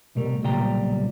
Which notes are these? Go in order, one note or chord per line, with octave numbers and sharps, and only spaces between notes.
C2 B2 G3 A3 A#4
B1 A#2 C#3 G3 G5 A#5